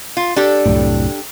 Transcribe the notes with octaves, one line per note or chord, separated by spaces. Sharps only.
F4
D4 G4 A4
C2 F#2 A2